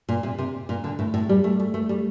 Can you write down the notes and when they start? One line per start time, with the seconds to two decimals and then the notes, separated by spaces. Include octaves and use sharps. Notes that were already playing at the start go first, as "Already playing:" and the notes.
0.09 A#2
0.23 C3
0.38 C3
0.69 A#2
0.84 D3
0.99 A2
1.14 A2
1.29 G3
1.44 A3
1.60 A3
1.74 A3
1.89 G3